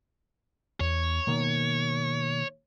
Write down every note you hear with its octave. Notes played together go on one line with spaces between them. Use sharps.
E2 C#5
B2 D#3 A#3